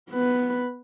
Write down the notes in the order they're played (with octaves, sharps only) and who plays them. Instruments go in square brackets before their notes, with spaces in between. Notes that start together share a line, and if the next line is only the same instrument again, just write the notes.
[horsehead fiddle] B3 B4